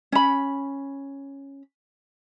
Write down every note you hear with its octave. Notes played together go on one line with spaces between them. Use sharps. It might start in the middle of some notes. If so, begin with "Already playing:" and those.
C#4 B5